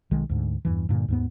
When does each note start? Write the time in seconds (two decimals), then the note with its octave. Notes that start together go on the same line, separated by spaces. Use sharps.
0.11 B1 D#3 G#3
0.29 D2 G#2
0.65 E2 G2 E3
0.89 G2 A#2 D3
1.08 D#2 G#2 B3